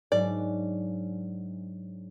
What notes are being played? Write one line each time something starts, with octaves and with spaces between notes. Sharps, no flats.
G#2 F#3 D4 D5